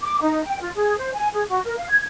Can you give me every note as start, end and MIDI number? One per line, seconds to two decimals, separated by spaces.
0.01 0.18 86
0.21 0.44 63
0.44 0.60 79
0.60 0.70 65
0.75 0.95 68
0.97 1.10 72
1.14 1.28 80
1.33 1.43 68
1.48 1.60 66
1.65 1.75 70
1.78 1.86 77
1.89 2.05 92